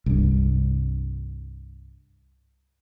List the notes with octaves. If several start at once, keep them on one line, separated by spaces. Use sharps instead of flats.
C2 G2